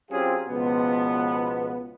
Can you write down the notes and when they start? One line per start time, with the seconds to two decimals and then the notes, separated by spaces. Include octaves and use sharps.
0.10 F#3 C4 C#4 F4 G4 G#4
0.47 C#2 B2 F3 B3